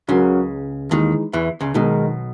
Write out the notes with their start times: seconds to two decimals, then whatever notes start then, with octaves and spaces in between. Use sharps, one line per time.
0.08 C#2 C#3 F#3 C#4 F#4 A#4
0.91 D#2 D#3 E3 G#3 D#4
1.33 E2 E3
1.60 C#2 C#3
1.74 B1 B2 D#3 G#3 D#4 A#4